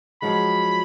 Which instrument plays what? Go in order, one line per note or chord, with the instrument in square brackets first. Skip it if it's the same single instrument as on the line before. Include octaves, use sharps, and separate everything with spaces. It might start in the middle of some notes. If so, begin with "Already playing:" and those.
[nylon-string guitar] F3 F#3 G#3 [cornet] B5